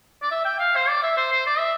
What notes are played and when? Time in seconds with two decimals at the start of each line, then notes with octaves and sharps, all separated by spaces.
0.22 D5
0.31 E5
0.45 G5
0.59 F5
0.76 C5
0.88 D5
1.03 E5
1.17 C5
1.32 C5
1.46 D5
1.58 E5